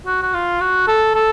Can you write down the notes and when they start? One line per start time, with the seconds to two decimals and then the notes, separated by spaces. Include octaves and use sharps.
0.07 F#4
0.23 F#4
0.34 F4
0.61 F#4
0.88 A4
1.15 A4